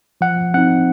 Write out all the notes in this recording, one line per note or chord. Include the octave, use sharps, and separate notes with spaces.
F3 F#5
C4 D#4 F#5